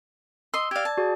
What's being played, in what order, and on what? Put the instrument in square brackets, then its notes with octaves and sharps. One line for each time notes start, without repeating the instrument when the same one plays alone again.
[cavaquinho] D#5 C6 [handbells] E6
[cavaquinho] G4 F5 [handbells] D5 G#6
[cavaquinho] A5
[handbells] F#4 G#4 D5